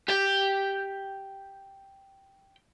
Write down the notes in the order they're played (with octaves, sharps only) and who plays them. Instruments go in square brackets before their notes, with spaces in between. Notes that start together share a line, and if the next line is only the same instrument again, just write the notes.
[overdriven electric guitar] G4 G5